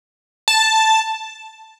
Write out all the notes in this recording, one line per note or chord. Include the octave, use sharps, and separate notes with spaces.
A5